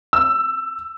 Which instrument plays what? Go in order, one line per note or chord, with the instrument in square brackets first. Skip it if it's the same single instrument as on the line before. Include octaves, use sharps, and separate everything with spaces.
[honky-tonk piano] E6